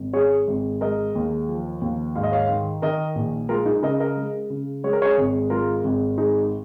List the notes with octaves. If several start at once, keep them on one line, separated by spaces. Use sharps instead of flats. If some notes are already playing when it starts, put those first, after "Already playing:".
Already playing: G#1
G#3 G#4 C#5
G#1
G#3 A#4 D#5
D#2
F3
D#2
G#2 F5
D#5
C#5 F5
D#3
D#3 A#4 D#5
A#1
G#3 F4 A#4
D#4 G#4
C#3 A#4 D#5
A#4 D#5
G#3
C#3
G#3 C#5
A#4
G#4 C#5
G#1
G#3 F4 A#4
G#1
G#3 D#4 G#4